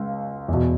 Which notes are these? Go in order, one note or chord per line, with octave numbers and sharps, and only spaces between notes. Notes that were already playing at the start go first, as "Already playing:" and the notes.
Already playing: C#2 F5
E2 B2